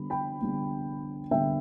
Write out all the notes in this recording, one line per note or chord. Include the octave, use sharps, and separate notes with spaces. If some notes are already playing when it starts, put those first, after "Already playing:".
Already playing: D3 G3 B3 B5
G5 B5
D3 G3 B3
D3 G3 B3 E5 G5